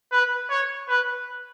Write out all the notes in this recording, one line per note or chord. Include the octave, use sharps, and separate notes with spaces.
B4
C#5
B4